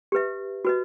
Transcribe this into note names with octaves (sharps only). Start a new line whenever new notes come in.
G4 B4 E5
F#4 B4 D#5